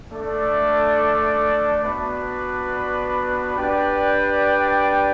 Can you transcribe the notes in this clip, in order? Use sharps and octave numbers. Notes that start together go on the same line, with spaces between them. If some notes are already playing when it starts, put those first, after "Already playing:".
A3 D4 A4 D5
B3 D4 F#4 B4 D5
D4 G4 B4 D5 G5